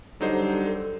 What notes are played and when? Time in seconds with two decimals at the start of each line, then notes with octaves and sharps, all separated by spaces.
0.21 D3 F#3 G3 D#4 A4 C5